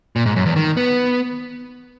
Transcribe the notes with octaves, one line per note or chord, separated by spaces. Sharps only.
A#2
G#2
F#2
E2
D#3
B3